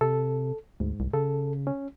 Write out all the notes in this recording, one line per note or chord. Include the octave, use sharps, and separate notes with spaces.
C3 A4
D2 G#2
C2
C#3 A4
C#4